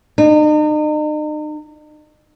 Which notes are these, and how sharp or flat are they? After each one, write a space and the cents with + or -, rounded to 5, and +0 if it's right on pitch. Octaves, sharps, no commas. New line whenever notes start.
D#4 -40